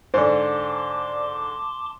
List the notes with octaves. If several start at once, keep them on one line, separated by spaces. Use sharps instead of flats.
G#2 D3 C5 D5 A5 C6 D6